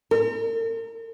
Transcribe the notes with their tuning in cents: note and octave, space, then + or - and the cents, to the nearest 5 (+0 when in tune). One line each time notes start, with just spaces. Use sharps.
A#4 -40